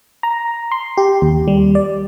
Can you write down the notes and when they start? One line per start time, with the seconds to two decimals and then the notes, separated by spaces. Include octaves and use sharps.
0.23 A#5
0.72 C6
0.97 G4
1.22 D#2
1.48 G3
1.75 D5